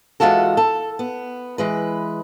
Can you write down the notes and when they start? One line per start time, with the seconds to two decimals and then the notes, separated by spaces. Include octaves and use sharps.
0.20 E3 F3 G#3 F4 F#4 A4
0.57 A4
0.99 B3
1.58 E3 G#3 B4